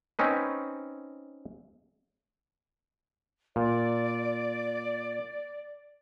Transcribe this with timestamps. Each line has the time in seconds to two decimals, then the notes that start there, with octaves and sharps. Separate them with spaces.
0.19 C4 C#4 D#4 B4
3.56 A#2 D5